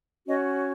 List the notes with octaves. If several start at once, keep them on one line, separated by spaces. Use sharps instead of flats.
C#4 F#4 C#5 D#5